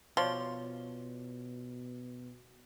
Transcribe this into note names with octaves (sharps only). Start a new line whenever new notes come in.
B2 F3 F4 C#5 D5 C6